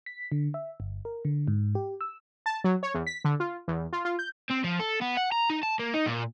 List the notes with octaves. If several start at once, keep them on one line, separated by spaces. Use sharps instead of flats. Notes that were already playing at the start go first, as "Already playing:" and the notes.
B6
D3
E5
G1
A#4
D3
G#2
G4
E6
A5
F#3
C#5
E2
B6
D3
F4
E2
F4
F4
G6
C4
F3
A4
B3
F#5
A#5
D#4
A5
A#3
D#4
A#2